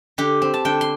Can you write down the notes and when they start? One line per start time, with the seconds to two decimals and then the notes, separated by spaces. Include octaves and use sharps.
0.18 D3 G4
0.42 C4
0.54 A5
0.65 D3 G5
0.81 C6